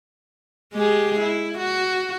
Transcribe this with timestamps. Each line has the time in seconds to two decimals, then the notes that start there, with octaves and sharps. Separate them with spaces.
0.73 G#3 G4 G#4
1.20 E4
1.58 F#4